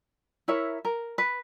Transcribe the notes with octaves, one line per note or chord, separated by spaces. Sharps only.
E4 A#4 C#5 E5
A#4
B4